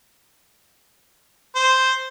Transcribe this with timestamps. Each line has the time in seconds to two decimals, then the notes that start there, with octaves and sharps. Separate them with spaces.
1.56 C5